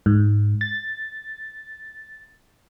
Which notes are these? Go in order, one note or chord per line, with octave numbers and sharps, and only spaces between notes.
G#2
A6